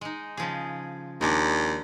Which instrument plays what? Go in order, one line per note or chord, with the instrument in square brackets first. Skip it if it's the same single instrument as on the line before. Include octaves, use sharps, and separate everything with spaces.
[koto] G#3 D#4
C#3 F3 G#4
[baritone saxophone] D#2 [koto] G#3 D4 D5